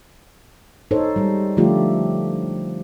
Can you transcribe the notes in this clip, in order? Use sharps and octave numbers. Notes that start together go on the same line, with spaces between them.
D#4 A4 C5 C#5
G3 G#3
D3 F3 A3 F4 G4